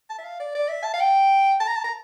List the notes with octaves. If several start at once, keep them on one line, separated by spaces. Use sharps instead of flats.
A5
E5
F5
D5
D5
E5
A5
F5
G5
A5
A#5
A5
A#5